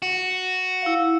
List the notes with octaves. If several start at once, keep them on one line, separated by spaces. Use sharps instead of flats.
F#4
E4 F5